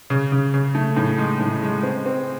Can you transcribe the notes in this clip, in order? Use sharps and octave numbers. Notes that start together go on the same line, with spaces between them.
C#3
C#3
C#3
A3
A2
G#3
A2
G#3
C4
C4